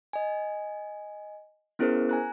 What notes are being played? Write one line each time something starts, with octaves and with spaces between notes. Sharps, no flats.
D#5 G#5
B3 C#4 E4 G#4 A#4 C5
G#5 A#5 F#6